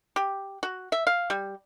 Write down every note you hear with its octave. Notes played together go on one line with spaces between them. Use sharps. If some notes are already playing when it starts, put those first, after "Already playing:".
G4
F#4
E5
F5
G3